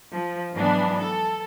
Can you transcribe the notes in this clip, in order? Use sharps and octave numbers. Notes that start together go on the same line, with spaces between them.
F3
G#2 E3 F#3 B3 D4
A4